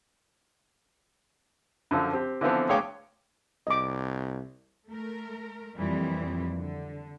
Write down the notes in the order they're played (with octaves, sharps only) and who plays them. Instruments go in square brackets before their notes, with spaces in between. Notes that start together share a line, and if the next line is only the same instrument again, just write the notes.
[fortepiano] F#2 D3 F3
C4 G4
D3 E3 F3 B3 C4
D2 G#4 C#5 F5 G5 D6
[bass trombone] C2 [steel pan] D#5 D6
[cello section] A3 A#4
F2 A#2 E3 F#3 G3 C4
D3